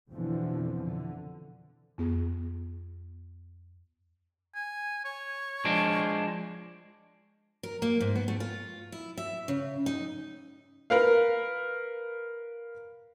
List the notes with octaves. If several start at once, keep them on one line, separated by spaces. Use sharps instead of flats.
F2 B2 D3 E3 F3
D3
F2 B3 G#4
G#5
C#5
F3 G#3 D4
A#4
A#3
G#2
B3
A3
F4
E4
E5
C#3
D#4
A#4 B4 F5